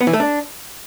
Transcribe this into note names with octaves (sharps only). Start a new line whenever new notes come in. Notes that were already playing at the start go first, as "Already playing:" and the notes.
B3
E3
A3
D4